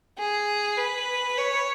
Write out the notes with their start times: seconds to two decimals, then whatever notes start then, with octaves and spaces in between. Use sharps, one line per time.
0.18 G#4
0.77 B4
1.38 C#5